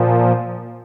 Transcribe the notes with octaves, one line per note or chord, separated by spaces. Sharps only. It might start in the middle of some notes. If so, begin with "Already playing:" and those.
Already playing: A#2 F3